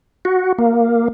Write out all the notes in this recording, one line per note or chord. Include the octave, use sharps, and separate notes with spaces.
F#4
A#3